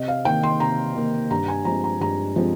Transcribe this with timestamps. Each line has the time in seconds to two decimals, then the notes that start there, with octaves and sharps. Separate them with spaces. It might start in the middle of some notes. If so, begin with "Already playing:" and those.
Already playing: C3 D#5
0.08 F5
0.25 D#3 A#3 G5
0.43 C6
0.60 C3 A#5
0.95 D#3 A#3
1.31 G2 A#5
1.48 G#5
1.65 F3 G#3 C4 A#5
1.84 A#5
2.00 G2 A#5
2.36 F3 G#3 C4